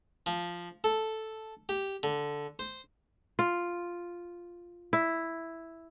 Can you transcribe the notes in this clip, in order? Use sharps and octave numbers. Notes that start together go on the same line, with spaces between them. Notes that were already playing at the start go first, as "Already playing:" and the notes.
F3
A4
G4
D3
C5
F4
E4